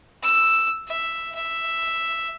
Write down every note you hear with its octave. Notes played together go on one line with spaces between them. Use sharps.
E6
E5
E5